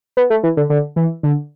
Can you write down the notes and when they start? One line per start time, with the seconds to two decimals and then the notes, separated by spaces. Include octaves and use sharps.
0.17 B3
0.30 A3
0.43 E3
0.57 D3
0.70 D3
0.96 E3
1.23 D3